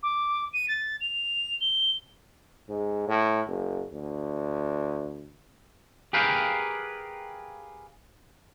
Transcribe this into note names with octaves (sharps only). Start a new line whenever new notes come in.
D6
D#7
A6
F7
G7
G#2
A2
F#1
D2
G4 G#4 A#4 B4 F5 G5